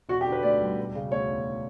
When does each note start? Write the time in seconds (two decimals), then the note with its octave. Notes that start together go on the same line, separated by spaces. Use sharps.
0.09 E1 F#4
0.21 G4
0.26 D3
0.32 B4
0.43 D2 D5
0.61 G3
0.78 E1
0.95 C#3
1.12 D2 C#5
1.29 E1